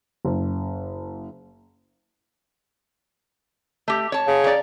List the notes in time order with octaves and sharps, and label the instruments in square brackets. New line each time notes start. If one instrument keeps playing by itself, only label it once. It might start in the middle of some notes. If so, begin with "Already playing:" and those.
[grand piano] F#1
[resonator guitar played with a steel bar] A3 G4
C#5 A5
[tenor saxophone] C#3
[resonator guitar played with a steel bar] D5 A#5